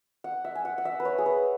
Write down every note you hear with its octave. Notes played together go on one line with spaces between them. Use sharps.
F#5
E5
G#5
F#5
F#5
E5
B4
C#5
G#4
B4